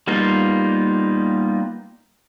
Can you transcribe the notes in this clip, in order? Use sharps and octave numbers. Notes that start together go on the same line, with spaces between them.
G3 A#3 B3 D#4 F4